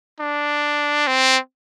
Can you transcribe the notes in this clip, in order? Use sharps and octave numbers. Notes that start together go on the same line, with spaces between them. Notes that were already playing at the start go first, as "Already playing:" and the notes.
D4
C4